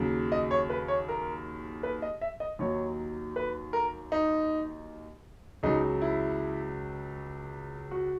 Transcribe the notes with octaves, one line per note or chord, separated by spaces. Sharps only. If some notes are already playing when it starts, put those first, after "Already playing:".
Already playing: D#2 C#3 F#3
D#5
C#5
B4
C#5
A#4
B4
D#5
E5
D#5
D#2 D#3 F#3 C#5
B4
A#4
D#4
C#2 C#3 F#3 D#4
E4
F#4